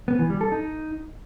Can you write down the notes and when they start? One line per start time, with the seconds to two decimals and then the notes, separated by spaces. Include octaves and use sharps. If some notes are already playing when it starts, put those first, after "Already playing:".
0.08 B3
0.19 E3
0.30 G3
0.41 A4
0.52 D#4